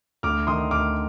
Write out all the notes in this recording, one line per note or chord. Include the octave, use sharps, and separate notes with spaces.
D2 D6 F6
D#3 C6 D#6
D2 D6 F6